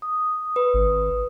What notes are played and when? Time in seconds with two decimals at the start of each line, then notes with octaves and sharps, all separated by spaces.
0.02 D#6
0.56 B4
0.74 G#1